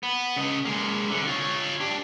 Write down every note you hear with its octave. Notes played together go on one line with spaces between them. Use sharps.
B3
C#3 D#5
G#3 A#3
C2 D3
F4 C#5
D4 G4